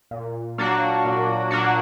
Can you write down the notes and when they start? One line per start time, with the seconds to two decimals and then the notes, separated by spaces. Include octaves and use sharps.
0.11 A#2
0.58 F#3 A#3 D4 F#4
1.05 A#2
1.51 F#3 A#3 D4 F#4